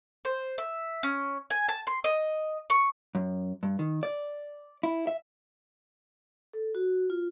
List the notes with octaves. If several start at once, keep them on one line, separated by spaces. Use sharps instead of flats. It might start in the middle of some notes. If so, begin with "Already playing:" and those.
C5
E5
C#4
G#5
A5
C6
D#5
C#6
F#2
G2
D#3
D5
E4
E5
A4
F#4
F4